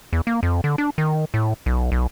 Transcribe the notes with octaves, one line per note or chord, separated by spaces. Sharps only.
E2
A#3
F2
D3
D4
D#3
A2
B1
B1